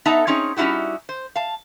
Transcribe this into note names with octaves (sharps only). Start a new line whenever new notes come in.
B3 D#4 A4 E5 A5 A#5
C4 C#4 D#4 G#4 C#5
G3 C#4 D#4 E4 F#4 G4
C5
F5 A5